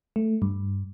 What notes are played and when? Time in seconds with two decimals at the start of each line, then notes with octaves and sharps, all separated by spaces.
0.16 A3
0.42 G2